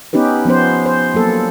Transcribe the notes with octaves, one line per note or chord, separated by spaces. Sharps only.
B3 C#4 D#4 G4 B4
F3 B3 C#4 C5
C5
F#3 A#3 A4